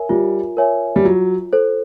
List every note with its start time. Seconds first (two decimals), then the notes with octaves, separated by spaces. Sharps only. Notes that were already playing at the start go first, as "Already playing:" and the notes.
Already playing: A#4 C#5 E5 G#5
0.09 G3 F4
0.57 A#4 C#5 E5 G#5
0.96 G3
1.04 F#3 F4
1.53 A4 C5